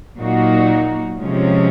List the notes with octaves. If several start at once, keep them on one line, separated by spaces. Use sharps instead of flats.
A#2 F#3 A#3 D#4 F#4
C3 F3 G#3 C#4